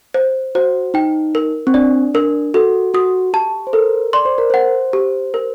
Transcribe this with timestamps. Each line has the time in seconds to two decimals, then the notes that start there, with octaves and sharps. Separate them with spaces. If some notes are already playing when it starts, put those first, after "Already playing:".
0.14 C5
0.55 F#4 C5
0.94 D#4 G5
1.35 A#4
1.67 C4
1.74 D4 D5
2.14 D4 A#4
2.54 F#4 A4
2.94 F#4 D#6
3.34 G4 A5
3.67 C5
3.73 A4 A#4
4.13 D5 C6
4.25 C5
4.38 A#4
4.50 C5 F#5
4.93 G4
5.34 A#4